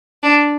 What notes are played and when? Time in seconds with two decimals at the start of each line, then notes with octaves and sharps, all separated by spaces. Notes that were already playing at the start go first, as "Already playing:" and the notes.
0.23 D4